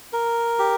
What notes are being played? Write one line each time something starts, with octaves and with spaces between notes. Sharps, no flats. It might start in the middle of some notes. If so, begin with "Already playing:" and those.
A#4
G4